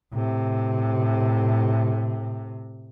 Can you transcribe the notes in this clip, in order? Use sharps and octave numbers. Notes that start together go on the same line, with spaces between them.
A2 C3